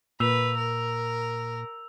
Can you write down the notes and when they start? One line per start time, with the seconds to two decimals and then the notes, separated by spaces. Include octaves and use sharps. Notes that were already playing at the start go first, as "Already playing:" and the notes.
0.20 A#2 A#3 B4 E6 F7
0.57 A#4